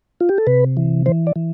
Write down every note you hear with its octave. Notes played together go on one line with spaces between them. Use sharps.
F4
G4
A4
C3 B4
E3
E3 C5
D5
E3